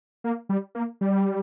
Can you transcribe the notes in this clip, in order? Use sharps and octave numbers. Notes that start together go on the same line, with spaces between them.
A#3
G3
A#3
G3